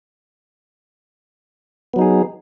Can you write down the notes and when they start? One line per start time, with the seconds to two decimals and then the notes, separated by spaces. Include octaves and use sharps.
1.93 B3
1.96 F#3
1.99 D#4
2.01 G#4